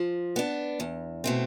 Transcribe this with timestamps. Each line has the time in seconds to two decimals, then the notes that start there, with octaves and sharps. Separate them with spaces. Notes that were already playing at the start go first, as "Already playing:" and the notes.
Already playing: F3
0.36 B3 D4
0.80 E2
1.24 B2 A3 C4